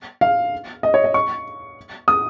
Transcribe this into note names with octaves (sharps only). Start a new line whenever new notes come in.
F5
D#5
C#5
D#5
C#6
D#6